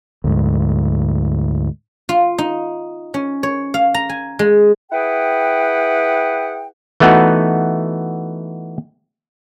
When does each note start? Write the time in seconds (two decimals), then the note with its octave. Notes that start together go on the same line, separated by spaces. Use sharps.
0.24 D2 G#2
2.09 F4
2.38 D#4
3.14 C#4
3.43 C#5
3.74 F5
3.94 A#5
4.09 G#5
4.39 G#3
4.92 E4 G#4 B4 F#5 G5
7.00 E3 A3 B3 D#4 F#4